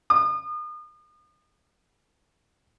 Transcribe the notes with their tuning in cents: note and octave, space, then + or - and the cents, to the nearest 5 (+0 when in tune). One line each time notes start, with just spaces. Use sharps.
D#6 -35